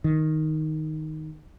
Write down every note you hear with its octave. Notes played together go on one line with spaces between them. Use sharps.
D#3